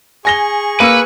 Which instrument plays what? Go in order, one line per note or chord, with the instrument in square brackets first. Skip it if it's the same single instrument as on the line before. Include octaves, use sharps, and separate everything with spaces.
[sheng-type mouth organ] G#4 C#6 [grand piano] G#5 A#6 G7
[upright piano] A#3 [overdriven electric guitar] B4 [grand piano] E6 C#7 D#7